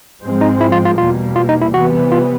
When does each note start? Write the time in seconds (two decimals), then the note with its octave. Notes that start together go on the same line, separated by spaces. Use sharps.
0.22 G#2 F3 G#3 C4
0.41 D#4
0.61 E4
0.72 F4
0.85 F4
0.98 E2 B2 G3 A#3 F4
1.36 F4
1.49 D#4
1.61 E4
1.73 C3 E3 G3 B3 F#4
2.12 F4